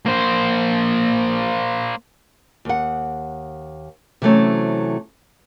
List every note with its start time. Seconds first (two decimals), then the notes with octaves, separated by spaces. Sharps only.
0.06 A#3 C5
2.65 D#2 F#5
4.22 C3 E3 F#3 A3 C4 C#4